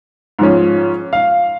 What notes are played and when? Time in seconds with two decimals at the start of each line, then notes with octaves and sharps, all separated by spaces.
0.39 G#2 F3 C#4
1.13 F5